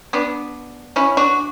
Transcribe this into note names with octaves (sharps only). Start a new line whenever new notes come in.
B3 D4
C#4 E4
D4 F#4